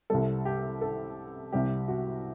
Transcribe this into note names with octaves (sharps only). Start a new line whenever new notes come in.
C2 C3 G3 A4
G4
A4
C2 C3 G3 G4
F#4